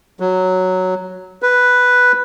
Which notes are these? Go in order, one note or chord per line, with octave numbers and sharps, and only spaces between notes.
F#3
B4